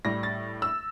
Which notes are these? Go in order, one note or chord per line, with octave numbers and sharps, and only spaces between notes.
A2 G3 A#6
A6
E6